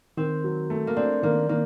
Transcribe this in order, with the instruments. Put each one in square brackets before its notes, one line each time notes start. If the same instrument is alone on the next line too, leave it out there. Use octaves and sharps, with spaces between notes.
[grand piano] D#3 [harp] C4
[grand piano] F#3
A3
[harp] A#3
[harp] C4 [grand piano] D4
[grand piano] D#3 [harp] A#3
[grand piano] D#3 [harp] A#3